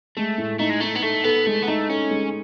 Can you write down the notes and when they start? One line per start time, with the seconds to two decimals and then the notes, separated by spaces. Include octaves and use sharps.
0.17 G#3 A3
0.38 A2
0.59 A3 D#4
0.70 G#3
0.81 A3 D#4
0.96 B3
1.03 A3 A4
1.24 B3 A4
1.47 G#3 A3
1.63 B3
1.68 A3 D#4
1.90 C#4 A4
2.11 G#3